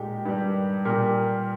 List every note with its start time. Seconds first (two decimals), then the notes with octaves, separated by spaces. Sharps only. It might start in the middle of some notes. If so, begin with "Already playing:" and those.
Already playing: A#2 G#3 D#4 G4
0.25 G2 D#3 G3
0.85 A#2 G3 G4 A#4